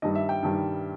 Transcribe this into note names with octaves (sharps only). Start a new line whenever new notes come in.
G2 D#3 G3 D#5
E5
G5
G2 D#3 G3